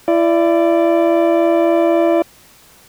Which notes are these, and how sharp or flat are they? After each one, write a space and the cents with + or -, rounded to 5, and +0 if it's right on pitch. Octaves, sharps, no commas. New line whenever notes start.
E4 +30 D5 +0